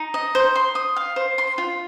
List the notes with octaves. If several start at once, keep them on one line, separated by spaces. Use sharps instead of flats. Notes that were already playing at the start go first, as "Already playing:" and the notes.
Already playing: D#4
D#5
C5
C6
D#6
F5
C5
C6
F4